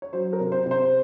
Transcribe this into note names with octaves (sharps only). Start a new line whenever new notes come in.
C#5
F#3 C5
A#4
C3
C5
C3
C5